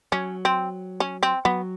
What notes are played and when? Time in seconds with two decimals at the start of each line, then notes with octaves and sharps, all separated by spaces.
0.12 F#3 C#4
0.45 C4
1.00 C#4
1.23 C4
1.45 F#3 B3